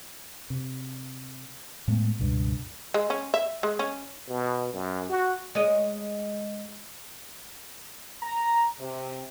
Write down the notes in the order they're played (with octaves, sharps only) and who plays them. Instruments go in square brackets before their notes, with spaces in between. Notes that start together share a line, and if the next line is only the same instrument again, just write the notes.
[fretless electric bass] C3
A2 G#3 A3 B3
C#2 G2 B2
[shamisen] G#3
C#4
E5
G#3
C#4
[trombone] B2
F#2
F#4
[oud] G#3 C#5 D#5
[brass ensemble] A#5
C3